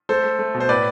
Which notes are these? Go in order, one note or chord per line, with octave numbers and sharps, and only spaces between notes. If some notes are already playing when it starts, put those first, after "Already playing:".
A3 A4 C5
A3
A3
B2
C5
A2 B4 D5